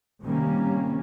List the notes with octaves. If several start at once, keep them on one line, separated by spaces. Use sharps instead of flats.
C3 D#3 G3 A#3 C#4